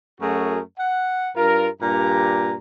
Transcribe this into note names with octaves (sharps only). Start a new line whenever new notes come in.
F#2 A3 F#4 G#4 A#4
F#5
G2 F4 A#4
G2 A#2 G4 A#5